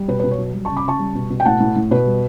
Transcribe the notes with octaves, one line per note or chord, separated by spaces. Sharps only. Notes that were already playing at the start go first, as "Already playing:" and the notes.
Already playing: G3
B2 B4
B4
B2
C#5
F#3
G3
A5 C#6
C#3
B5 D6
C#3 A5 C#6
G3
B2
B2
G5
A2 F#5 A5
A2
A2
B2 B4
G3